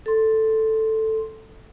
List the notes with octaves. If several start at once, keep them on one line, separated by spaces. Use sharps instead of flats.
A4 C6